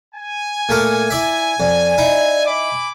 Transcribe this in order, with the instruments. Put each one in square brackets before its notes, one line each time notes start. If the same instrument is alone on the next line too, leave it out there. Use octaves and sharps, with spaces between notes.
[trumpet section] G#5
[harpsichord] A#2 A3 A#4
E4 D5 E5
[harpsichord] F2 [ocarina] D5
[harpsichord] D#4 E4
[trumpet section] G#5 B5 D6